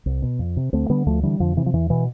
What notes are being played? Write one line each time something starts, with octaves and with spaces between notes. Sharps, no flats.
C2
B2
F2
C3
D2 A3 C4
D3 G3 B3
D2 F3 A3
D3 E3 G3
F2 D3 F3
C3 E3
F3
E2 E3
B2 E3